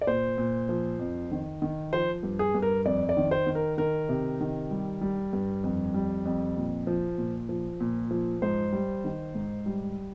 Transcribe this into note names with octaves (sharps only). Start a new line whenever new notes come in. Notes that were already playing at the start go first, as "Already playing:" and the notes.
D5
A#2 C5
A#2
F3
F2
D#3
D#3
F3 C5
G2
G#4
G2
A#4
F2 D5
D5
D#3
C5
D#3
A#4
D#3 A#4
C3
D#3
G3
G3
G2
F2
G3
F2
A#2
F3
A#2
F3
A#2
F3
G#2 C5
G3
D#3
G#2
G3